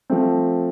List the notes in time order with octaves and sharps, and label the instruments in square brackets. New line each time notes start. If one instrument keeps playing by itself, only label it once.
[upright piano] F3 A3 C4